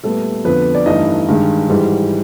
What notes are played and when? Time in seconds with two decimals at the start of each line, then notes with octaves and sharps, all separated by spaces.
0.03 A#2 G3 A3 B3 A4
0.44 F2 D3 F3 B3 B4
0.75 D5
0.86 G2 E3 A3 D#4 D#5
1.28 G2 D#3 G#3
1.69 G#2 E3 G3